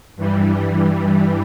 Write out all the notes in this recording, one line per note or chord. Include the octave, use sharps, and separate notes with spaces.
G2 E3 G3